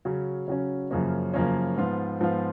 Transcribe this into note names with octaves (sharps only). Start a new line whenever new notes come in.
C#3 F#3 C#4
C#3 F#3 C#4
F#2 C#3 F3 A#3 C#4
F#2 C#3 F3 A#3 C#4
G#2 F3 B3 F4
G#2 F3 B3 F4